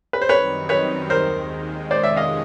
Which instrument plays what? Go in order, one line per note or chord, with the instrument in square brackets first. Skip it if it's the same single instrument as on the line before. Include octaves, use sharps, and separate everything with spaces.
[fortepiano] B4
C5
[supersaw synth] F#2 D#3 G3 C4 D#4 [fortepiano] B4 C#5
[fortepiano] B4 C#5
[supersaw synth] D#2 D#3 G#3 [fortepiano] A#4 C5
[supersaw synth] F2 C3 D#3 G#3 C#4 [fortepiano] C5 D5
[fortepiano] D5 E5
D#5 F5